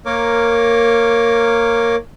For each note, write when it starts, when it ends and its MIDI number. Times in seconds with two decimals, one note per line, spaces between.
0.06 1.96 58
0.06 1.96 70
0.06 1.96 73
0.06 1.96 86